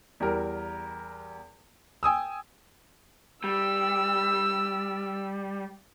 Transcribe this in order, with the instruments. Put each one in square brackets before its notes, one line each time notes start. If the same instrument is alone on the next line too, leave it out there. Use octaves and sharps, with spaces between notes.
[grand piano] E2 G3 A#4
G5 G#5 D#6 E6
[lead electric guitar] G3 [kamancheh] E6